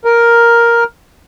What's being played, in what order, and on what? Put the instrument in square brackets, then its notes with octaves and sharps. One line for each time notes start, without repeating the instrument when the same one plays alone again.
[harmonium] A#4